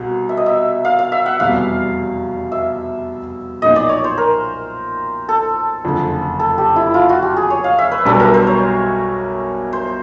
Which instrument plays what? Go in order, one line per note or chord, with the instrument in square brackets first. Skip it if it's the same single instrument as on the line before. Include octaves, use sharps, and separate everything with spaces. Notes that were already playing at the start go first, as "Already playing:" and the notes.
Already playing: [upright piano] C2 B2
[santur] E5
D#5
E5
F5
F5
E5
F#5
[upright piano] F1 E2 B2 G3 [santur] F5
[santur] E5
[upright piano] B1 A#2 F3 A#3 D#4 [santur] D#5
[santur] D5
C#5
C5
A#4
A4
[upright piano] F#1 F2 D3
[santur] A4
G4
E4
F4
F#4
G4
G#4
C#5
F5
E5
B4
[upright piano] B1 B2 G3 B3 D4 [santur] A4
[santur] A#4
C5
C#5
C5